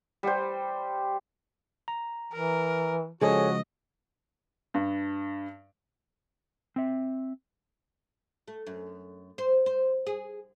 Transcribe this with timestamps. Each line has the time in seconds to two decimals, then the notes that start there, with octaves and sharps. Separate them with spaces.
0.23 G3 C5
1.88 A#5
2.33 E3 A#4
3.21 C#3 F3 G#3 F#4 G#4 A4 C#5 D#5
4.74 G2
6.76 C4 E5
8.48 A3
8.66 F#2
9.38 C5
9.66 C5
10.07 G#4